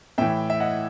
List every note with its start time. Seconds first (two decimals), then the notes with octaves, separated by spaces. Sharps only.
0.18 A2 E3 E5 G5
0.50 E5
0.60 D#5 F#5